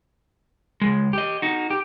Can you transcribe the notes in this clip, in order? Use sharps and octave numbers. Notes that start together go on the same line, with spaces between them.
C#2 G#3
G4 D#5
D#4 F#4
G4